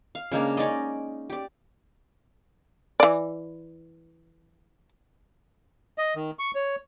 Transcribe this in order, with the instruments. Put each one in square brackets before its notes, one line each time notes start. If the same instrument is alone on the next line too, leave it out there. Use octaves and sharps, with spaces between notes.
[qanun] F5
C#3 G#3 A#3 D4
C#4 D#4 D5 D#5
G4 D5
[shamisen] E3 D5
[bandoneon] D#5
D#3
C#6
C#5